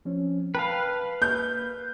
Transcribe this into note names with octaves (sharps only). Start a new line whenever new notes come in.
F3 C4 C#4
B4 F5 G5 A5 B5
A#3 G6